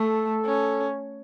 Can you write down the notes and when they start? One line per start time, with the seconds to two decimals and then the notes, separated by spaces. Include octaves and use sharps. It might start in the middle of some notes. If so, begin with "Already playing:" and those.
Already playing: A3 A4
0.46 C#4